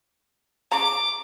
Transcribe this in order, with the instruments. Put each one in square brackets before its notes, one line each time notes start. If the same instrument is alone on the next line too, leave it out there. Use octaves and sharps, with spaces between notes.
[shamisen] C#3 A#5 [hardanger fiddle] D6